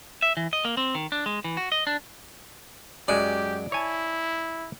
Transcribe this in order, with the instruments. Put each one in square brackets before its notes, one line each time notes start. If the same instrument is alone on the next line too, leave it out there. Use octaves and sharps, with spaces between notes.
[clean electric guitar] E5
E3
D#5
A#3
C4
D#3
D4
G#3
E3
F#4
D#5
D4
[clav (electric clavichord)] F#2 F#3 G#3 [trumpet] G4 [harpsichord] D5
[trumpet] E4 [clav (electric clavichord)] C#5 G#5 A5